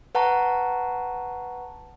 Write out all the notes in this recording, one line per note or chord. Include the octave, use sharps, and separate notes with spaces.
B4 F#5 A5 A#5 C#6